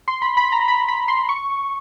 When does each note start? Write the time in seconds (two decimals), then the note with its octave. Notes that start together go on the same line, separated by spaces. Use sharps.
0.08 C6
0.22 B5
0.37 B5
0.52 A#5
0.68 B5
0.89 B5
1.08 C6
1.29 C#6